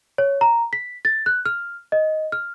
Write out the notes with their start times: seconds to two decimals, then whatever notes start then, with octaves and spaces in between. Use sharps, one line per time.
0.18 C#5
0.41 A#5
0.73 B6
1.05 A6
1.26 F#6
1.46 F6
1.92 D#5
2.32 F6